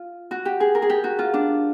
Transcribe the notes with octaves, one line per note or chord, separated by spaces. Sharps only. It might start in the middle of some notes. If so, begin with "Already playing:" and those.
Already playing: F4
F#4
G4
G#4
A#4
G#4
G4
F#4
F4
D4